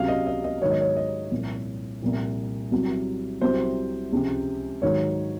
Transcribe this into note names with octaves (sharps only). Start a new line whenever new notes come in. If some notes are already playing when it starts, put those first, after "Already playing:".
Already playing: C#2 C3 F#3 F5
D#5
D#5
D#5
G#2 D#3 F#3 C#5
D#5
C#5
D#5
C2 A#2 F3
C2 A#2 F3
C2 C3 F#3
C2 C3 F#3 C5
C#2 C3 F3
G#2 D#3 F#3 C#5